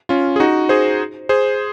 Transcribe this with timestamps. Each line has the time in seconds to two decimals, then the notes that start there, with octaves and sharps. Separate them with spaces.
0.09 C#4 F4
0.36 G#4
0.40 D#4 F#4
0.69 G#4 C5
1.29 G#4 C5